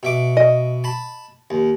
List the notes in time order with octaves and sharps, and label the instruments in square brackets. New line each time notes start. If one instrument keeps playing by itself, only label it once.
[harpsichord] B2 E5 D6
[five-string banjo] D#5
[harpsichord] A5 B5
D#2